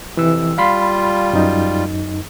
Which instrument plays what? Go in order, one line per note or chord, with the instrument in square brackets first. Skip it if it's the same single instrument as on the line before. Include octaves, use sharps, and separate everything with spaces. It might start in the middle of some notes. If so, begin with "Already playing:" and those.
[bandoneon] F2 C3 [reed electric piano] E3 E6
[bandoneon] G3 F4 [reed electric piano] F5 B5 C6
[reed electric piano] F#2 D#4